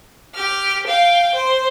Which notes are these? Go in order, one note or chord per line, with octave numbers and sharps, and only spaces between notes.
G4 F6
F5 G5
C5